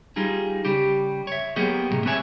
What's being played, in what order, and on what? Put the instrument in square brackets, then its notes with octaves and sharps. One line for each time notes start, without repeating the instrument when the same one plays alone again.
[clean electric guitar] G3 D#4 F4 G#4
C#3 G3 G4
C#5 E5
F#3 A#3 B3 G4 G#4 D#5
C2 A2 C3
G#3 C4 B4 C#5 E5 G#5